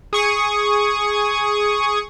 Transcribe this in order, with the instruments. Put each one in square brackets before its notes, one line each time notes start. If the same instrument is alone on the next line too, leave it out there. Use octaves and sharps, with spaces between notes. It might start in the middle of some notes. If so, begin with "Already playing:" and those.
[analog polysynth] G#4 C#6 D#6